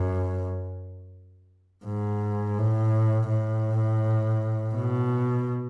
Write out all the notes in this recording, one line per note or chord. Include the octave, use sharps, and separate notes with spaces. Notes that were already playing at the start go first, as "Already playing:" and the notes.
Already playing: F#2
G#2
A2
A2
B2